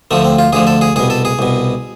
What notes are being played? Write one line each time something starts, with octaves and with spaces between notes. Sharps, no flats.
D2 D3 F3 A3
C4
F4
D2 D3 F3 G#4
A4
G#4
C2 B2 G#4
A4
G#4
C2 B2